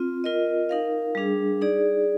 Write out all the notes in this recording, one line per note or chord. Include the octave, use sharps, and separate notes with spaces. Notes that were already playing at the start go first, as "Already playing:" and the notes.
Already playing: C4 F4
F4 A#4 D#5
D#4 A#4 F5
G3 D4 G#4
D#4 G#4 D5